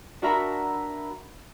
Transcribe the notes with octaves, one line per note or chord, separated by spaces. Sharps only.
D4 F#4 A#4 E5 A#5 B5